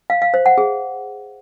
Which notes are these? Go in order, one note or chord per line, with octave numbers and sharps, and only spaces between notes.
F5
F5
C5
F#5
G#4